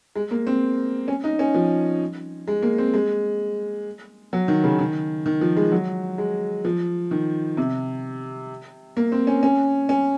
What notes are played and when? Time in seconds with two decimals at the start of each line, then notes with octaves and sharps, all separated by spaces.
0.16 G#3
0.31 A#3
0.47 C4
1.08 C#4
1.24 D#4
1.39 C#4
1.54 F3
2.48 G#3
2.62 A#3
2.78 C4
2.94 G#3
4.33 F#3
4.48 D#3
4.64 C#3
4.79 D#3
5.26 D#3
5.41 F3
5.57 G#3
5.72 F#3
6.18 G#3
6.65 F3
7.11 D#3
7.57 C3
8.97 A#3
9.12 C4
9.27 C#4
9.43 C#4
9.89 C#4